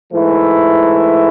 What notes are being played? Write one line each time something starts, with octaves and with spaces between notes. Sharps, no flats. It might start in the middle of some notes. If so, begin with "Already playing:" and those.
G#2 E3 A3 E4